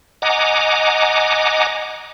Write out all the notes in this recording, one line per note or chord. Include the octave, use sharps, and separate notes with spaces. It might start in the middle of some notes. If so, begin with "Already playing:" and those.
D#5 F#5 G#5 A#5 D6